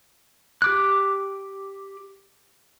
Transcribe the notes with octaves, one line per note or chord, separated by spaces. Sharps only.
G4 D6 F#6